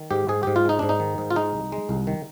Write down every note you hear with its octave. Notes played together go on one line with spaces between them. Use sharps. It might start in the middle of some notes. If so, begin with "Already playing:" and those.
Already playing: D#3
G#2 G4
G#2 G#4
G#2 G4
F4
G#3 D#4
G#2 D4
D#4
D#3
G#2
F4
G#3 D#4
C2
G#3
C2
D#3